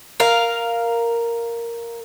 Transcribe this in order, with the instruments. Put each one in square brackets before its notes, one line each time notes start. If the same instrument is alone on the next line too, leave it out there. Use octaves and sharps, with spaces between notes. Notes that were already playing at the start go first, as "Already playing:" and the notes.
[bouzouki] A#4 F5